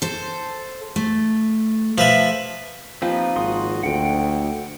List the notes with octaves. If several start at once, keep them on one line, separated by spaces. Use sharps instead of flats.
A4 C5
A3
F3 A4 B4 E5
F3 A#3 C4 D#4 G4 B4
G#1 F#4 C6 D#6
D2 F#5 G5